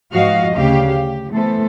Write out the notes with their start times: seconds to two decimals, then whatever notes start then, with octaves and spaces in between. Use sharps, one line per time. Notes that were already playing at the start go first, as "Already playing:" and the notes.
0.12 G#2 F3 F#4 D#5 F5
0.56 D2 C#3 G4 F5
0.88 G4
1.33 E3 A3 B3 A4 C5